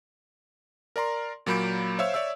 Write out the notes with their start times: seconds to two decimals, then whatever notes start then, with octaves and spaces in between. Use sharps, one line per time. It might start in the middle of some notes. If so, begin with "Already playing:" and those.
0.96 A#4 D5 A#5 C6
1.46 A#2 F#3 A#3 B5 G6 D7
1.99 C5 C#5 E5 F5 E6
2.14 C#5 D5 E5 E6